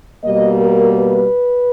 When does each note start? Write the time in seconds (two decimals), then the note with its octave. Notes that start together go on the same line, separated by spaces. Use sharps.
0.25 B2 G3 A#3 D#5
0.62 A#4
0.98 B4